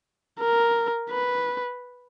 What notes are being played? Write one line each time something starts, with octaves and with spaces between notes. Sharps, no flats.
A#4
B4